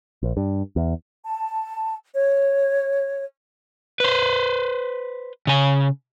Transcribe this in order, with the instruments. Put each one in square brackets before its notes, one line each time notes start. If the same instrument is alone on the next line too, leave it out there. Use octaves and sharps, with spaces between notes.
[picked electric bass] A#1
G2
E2
[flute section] A5
C#5
[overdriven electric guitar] B4 C5
C#3 G#5